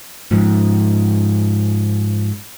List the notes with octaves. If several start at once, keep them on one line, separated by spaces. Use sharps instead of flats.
G#2 F3